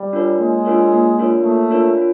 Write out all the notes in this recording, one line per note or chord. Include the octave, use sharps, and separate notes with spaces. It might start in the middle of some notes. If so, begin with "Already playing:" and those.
Already playing: G3
D4 F4 A#4 C#5
G#3 A#3
D4 F4 A#4 C#5
A#3
D4 F4 A#4 C#5
A3 A#3
D4 F4 A#4 C#5
F4